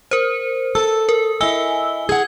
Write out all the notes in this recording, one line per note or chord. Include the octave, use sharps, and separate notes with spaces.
A#4 C5
A4 E6
A#4
E4 D#5 G#5 E6 G7
G#4 F#5 G#6